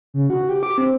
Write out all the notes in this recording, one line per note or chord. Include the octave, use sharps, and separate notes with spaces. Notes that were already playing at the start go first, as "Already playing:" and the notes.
C#3
F#4
G4
D6
C4